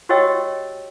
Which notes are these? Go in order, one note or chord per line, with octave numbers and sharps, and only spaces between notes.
F#4 G4 C#5 D#5 G5 E6